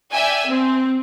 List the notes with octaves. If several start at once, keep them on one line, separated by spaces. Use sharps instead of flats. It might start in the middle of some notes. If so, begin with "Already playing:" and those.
D5 E5 G5 G#5
C4